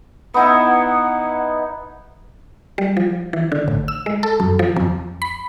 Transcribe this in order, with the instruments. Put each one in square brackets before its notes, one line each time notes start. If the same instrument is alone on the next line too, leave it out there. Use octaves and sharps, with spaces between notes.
[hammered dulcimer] B3 D#4 E4 [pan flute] F#5
[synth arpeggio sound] G3
F3
E3
D3
A1
E6
G#3
A4
F#2
F3
F2
B5